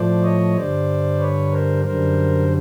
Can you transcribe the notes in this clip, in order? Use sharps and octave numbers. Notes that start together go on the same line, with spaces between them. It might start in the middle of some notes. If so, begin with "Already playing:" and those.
Already playing: A2 F3 A3 C5 D5
C#5 D#5
G2 D3 G3 C5 D5
B4 C#5
A#4 C5
F#2 D3 G3 A#4 C5